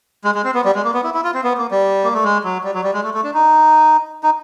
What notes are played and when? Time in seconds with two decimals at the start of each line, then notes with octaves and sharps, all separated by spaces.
0.24 G#3
0.35 G#3
0.44 C4
0.54 B3
0.64 G3
0.75 G#3
0.84 A#3
0.94 B3
1.04 E4
1.14 E4
1.24 F4
1.34 C4
1.44 B3
1.57 A#3
1.71 G3
2.04 A#3
2.14 A3
2.24 G#3
2.44 F#3
2.64 G3
2.74 F#3
2.84 G3
2.94 G#3
3.04 A3
3.14 A3
3.24 D4
3.34 D#4
4.23 D#4